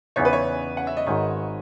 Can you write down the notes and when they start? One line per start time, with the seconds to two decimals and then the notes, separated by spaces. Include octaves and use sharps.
0.16 E2 C#3 E3 B3 D#4 C#5
0.25 B4
0.33 C#5
0.77 F#5
0.87 E5
0.97 D#5
1.07 G#1 G#2 D#3 C#5